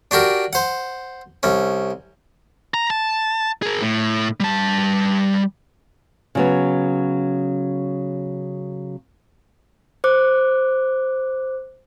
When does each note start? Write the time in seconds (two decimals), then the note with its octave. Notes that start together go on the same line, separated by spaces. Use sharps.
0.11 D4 F#4 G4 A#4
0.53 C5 F#5
1.43 C2 C#4
2.74 A#5
2.90 A5
3.62 G#4 A#4
3.81 A2
4.40 G3 A5
6.35 C#3 F#3 B3
10.04 C5 D6 F#6